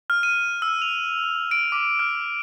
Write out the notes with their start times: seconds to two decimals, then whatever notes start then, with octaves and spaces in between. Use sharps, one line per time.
0.10 F6
0.23 D#7
0.62 E6
0.82 F7
1.51 D7
1.72 D6
1.99 F6